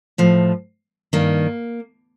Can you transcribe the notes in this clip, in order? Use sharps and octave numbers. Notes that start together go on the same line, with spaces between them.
A2 F3
G2 D#3 A#3